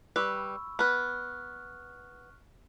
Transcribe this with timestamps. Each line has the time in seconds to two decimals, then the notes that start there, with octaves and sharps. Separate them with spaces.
0.16 G3 B4 B5 C#6 E6
0.79 B3 B4 C#6 F6 F#6